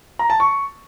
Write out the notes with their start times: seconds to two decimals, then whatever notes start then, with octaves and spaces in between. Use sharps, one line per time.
0.19 A#5
0.30 A5
0.40 C#6